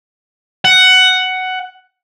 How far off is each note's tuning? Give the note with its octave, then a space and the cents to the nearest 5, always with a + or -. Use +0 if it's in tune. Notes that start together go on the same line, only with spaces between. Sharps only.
F#5 +10